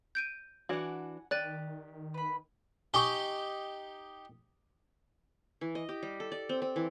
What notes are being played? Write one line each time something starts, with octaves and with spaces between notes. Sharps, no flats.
G6 D7 D#7
E3 D4 F#4 F#5 G#5
D#3 G4 D5 F#6 A6 D#7
B4 B5
D#4 G4 G#5 C#6
E3
D#5
G4
G3
A4
D5
C4
C4
E3